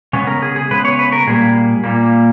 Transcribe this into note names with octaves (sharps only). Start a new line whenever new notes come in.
C#3 G#3 B3 C#4
A#4
G#4
G#4
C#3 G#3 B3 B4
C#5
B4
A#4
A#2 G3 A#3 G#4
A#2 G3 A#3